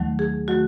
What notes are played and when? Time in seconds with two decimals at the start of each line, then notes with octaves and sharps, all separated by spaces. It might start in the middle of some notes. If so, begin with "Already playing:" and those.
Already playing: D#2 D#3 F#3 A3
0.19 G#4
0.48 D#3 F#3 A3 F#4